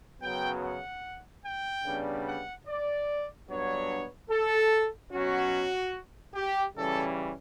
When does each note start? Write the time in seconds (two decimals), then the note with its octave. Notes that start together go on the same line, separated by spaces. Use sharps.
0.21 F#2 C#3 F#3 B3 G5
0.63 F#5
1.44 G5
1.85 C#3 G3 B3 D4
2.26 F#5
2.67 D5
3.49 G2 F#3 B3 D4 C#5
4.30 A4
5.12 B2 F#3 C#4 F#4
6.35 G4
6.76 C#3 E3 G3 C#4 A4